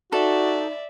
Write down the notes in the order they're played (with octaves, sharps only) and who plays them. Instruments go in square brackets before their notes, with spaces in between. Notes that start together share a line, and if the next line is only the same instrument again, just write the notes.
[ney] D#4 [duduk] F#4 [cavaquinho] A4 [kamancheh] D5 E5